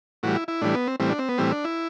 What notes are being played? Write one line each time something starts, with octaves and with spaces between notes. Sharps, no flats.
A2 E3 G3 F#4
E4
E4
A2 E3 G3 D4
B3
C4
A2 E3 G3 C4
D4
C4
B3
A2 E3 G3 C4
D4
E4